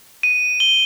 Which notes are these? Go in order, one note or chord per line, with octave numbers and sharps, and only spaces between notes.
D#7
G7